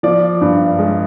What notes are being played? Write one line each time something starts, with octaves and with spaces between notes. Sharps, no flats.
F3 D5
G2
G#3